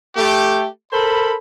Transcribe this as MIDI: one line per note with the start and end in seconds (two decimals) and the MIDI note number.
0.16 0.66 57
0.16 0.66 67
0.92 1.35 69
0.92 1.35 70
0.92 1.35 72
0.92 1.35 83